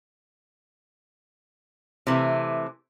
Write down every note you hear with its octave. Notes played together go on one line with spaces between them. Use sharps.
C3 E3 A3